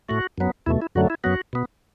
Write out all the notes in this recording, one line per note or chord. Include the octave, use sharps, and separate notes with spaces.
A2 A3 F#4
F#2 F#3 B3
E2 B2 A3 E4
E4
F#2 D3 F#3 A3 F#4
E4
F#2 F#3 B3 F#4
B2 B3